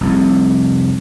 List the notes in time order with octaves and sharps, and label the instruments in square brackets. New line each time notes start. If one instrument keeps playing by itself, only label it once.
[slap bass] F1 C2 F2